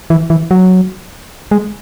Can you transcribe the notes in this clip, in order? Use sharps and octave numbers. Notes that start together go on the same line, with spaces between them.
E3
E3
F#3
G#3